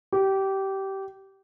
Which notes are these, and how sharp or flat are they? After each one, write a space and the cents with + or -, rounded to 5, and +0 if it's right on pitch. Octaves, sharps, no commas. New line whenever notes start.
G4 -20